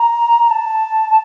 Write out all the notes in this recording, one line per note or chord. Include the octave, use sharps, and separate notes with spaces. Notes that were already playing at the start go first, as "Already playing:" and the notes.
Already playing: A#5
A#5
A5